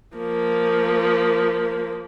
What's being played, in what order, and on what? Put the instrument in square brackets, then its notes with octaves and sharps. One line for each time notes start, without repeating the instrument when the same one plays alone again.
[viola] F3 A#3